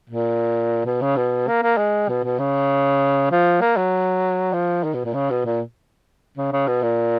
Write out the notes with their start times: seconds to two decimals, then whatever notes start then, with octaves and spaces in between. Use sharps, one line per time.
0.10 A#2
0.86 B2
1.02 C#3
1.17 B2
1.48 A#3
1.63 A#3
1.78 G#3
2.09 B2
2.24 B2
2.39 C#3
3.31 F3
3.61 A#3
3.77 F#3
4.53 F3
4.84 D#3
4.94 B2
5.05 A#2
5.14 C#3
5.30 B2
5.45 A#2
6.37 C#3
6.52 C#3
6.67 B2
6.83 A#2